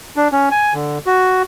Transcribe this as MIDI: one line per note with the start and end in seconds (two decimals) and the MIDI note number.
0.16 0.28 62
0.32 0.49 61
0.51 0.74 80
0.74 0.98 50
1.06 1.43 66